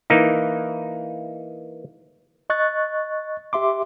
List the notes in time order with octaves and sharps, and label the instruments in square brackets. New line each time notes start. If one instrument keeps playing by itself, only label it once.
[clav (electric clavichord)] E3 A#3 D#4
[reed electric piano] D#5 C#6 F#6 A6
G4 E5 C6 D6